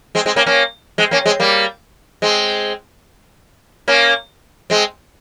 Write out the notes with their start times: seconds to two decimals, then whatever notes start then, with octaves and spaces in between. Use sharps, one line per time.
0.15 G#3 C4
0.26 G#3 C4
0.36 A#3 C#4
0.47 A#3 C#4
0.98 G#3 C4
1.11 A#3 C#4
1.26 G#3 C4
1.40 G3 A#3
2.22 G#3 C4
3.88 A#3 C#4
4.70 G#3 C4